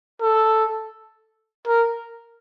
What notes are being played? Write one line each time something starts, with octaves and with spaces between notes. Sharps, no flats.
A4
A#4